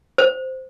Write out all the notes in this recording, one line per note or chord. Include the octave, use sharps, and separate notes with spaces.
C5